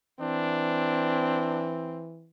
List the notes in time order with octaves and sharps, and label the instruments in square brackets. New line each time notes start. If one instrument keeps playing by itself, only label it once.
[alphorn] E3 [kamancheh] C4 [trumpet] D4